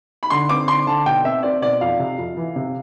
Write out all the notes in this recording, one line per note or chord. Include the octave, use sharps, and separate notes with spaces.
B5
D3 C6
C4 D6
D3 C6
D3 A5
B2 G5
C4 E5
C4 D5
B2 D5
F2 F5
C3
F2
E3
C3